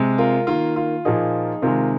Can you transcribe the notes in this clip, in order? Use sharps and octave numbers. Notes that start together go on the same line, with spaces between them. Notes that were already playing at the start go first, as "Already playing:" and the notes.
Already playing: C3 G#3
F4 A#4
D#3 A#3 F4
F4
A#2 F3 A#3 D#4 G#4
C3 D#3 G#3 F4 A#4